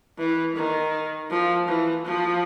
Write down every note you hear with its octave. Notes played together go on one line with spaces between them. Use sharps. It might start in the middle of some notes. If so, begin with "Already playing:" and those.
E3
D#3
F3
E3
F3